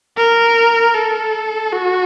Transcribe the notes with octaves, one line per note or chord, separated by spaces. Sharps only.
A#4
A4
F#4